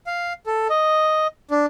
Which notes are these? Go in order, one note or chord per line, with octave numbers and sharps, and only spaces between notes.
F5
A4
D#5
D4